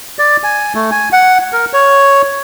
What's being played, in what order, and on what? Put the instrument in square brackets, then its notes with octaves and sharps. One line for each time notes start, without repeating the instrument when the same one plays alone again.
[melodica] D5
G#5
A3
G#5
F#5
A#4
C#5